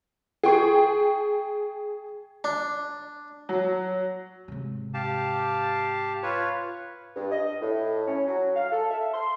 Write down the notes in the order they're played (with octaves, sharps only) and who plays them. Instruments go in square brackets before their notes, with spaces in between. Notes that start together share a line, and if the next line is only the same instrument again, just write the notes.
[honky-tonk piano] G#4 G5 C#6
[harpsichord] D4
[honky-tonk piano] F#3
[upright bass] G#2 C3
[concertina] G4 F5 A5
F4 B4 C#5
[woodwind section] G2
D#5
A2
C#4
F#3
F5
A4
E5
C6